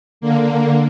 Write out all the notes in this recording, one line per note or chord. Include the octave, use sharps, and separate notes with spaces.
D3 A#3